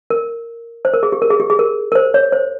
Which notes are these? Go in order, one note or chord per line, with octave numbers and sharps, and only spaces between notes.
A#4
C5
A#4
G#4
G4
A#4
G#4
G4
G#4
A#4
A#4
C5
C#5
C5